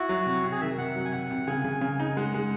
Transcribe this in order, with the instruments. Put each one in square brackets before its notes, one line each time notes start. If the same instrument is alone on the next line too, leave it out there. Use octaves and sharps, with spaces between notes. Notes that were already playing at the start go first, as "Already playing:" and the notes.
Already playing: [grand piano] E4 [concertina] F#4
[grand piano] F#3
C3
C3
[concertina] G#4
[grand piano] D#3 [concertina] E5
[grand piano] C3 [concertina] F#5
[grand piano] F#3
[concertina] G#5
[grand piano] C3 [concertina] F#5
[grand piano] C3
[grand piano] C#3 [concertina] G#5
[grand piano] C#3
C#3
D#4
[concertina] G#5
[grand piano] G#3 [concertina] F#5
[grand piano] G#3